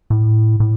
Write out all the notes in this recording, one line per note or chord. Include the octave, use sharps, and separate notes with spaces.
A2
A2